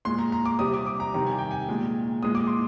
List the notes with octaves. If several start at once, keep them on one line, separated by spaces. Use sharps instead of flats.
A#2 G#3 C6
A#5
A#5
D6
C3 G3 D#6
D6
D6
A#5
C3 D#3 G3 A#5
G#5
G5
G#5
A#2 G#3
A#2 G#3 D#6
D6
C6